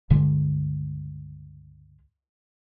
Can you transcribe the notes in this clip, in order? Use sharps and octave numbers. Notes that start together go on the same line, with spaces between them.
C#2 G2 D3 G#3